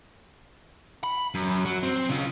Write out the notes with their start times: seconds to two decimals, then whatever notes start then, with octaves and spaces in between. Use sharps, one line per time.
1.04 B5
1.35 F#2
1.65 F#3
1.83 C4
2.10 C#3 F4